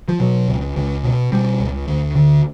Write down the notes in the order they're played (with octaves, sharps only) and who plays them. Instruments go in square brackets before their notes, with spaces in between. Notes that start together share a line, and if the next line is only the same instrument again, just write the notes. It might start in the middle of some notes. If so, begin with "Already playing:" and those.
[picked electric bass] F3
B2 F#3
C#2
C#2
B2
B2 G3
C#2
D2
D3